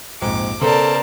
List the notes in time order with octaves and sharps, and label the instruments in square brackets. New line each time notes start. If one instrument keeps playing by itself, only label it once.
[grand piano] A#1 F2 G#2 [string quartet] D6
[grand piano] C#3 B3 [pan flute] A4 [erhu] A#4 [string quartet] C5 D5 A5